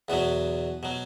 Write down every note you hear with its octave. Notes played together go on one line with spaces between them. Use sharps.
E2 B2 F#3 B3
B2 F#3